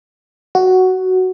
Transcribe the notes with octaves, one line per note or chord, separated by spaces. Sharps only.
F#4